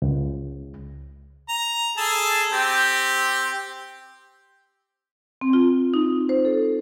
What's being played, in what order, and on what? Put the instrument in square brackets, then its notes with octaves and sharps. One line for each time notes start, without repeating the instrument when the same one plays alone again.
[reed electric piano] C#2
[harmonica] A#5
G#4 A4 A5
C4 G4
[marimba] C4
F4
D#4
C5
A4